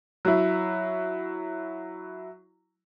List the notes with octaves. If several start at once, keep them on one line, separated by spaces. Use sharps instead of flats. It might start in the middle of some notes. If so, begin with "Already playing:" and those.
F#3 E4